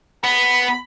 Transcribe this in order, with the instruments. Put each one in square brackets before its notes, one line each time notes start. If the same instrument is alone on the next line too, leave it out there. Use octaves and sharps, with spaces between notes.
[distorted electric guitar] B3 [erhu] B5